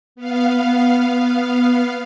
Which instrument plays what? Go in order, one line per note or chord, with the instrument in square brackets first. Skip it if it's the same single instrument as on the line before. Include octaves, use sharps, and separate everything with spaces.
[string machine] B3 F5